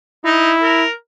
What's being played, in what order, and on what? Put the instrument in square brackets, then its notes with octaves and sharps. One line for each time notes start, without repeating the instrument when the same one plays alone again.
[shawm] D#4 [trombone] E4
[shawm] A#4